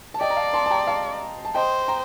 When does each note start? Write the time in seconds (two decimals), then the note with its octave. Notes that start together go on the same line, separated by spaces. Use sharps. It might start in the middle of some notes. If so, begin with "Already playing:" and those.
0.14 A5
0.20 D5 D#5 G5
0.30 A#5
0.37 F5 A5
0.54 A5 C6
0.66 A5
0.70 G5 A#5
0.87 F5 A5
1.45 A5
1.55 C5 D#5 G5
1.88 G5 A#5